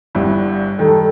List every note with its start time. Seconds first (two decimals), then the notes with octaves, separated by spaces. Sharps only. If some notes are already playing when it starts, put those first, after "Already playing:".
0.15 G1 G2 E4
0.79 G2 D#3 A4